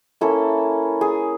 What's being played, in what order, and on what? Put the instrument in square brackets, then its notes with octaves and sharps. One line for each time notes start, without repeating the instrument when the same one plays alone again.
[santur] A#3 C#4 E4 A4
G#4